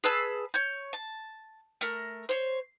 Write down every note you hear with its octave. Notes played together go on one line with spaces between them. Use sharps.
G#4 B4 A5 E6
C#5 G6
A5
A3 A#4
C5 C#5